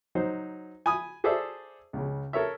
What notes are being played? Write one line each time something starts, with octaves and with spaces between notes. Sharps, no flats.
F#3 D#4 C5
G#5 B5 D#6
G#4 A4 C5 D5 E5
C#2 C#3
A4 A#4 C#5 E5